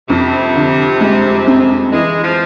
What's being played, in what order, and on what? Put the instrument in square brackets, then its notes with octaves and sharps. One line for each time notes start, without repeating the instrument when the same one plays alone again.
[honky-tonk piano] F2 [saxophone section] C3
[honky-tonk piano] D3
G#3
C4
[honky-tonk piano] E3 [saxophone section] G#3
[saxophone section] F3